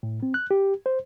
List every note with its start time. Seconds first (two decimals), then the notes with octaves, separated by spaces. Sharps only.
0.03 A2
0.23 C4
0.34 F#6
0.51 G4
0.86 C5